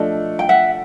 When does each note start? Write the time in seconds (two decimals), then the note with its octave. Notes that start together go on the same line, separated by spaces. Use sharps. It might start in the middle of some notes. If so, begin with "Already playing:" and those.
Already playing: F3 A3 D4 D#5
0.39 G5
0.49 E5 F#5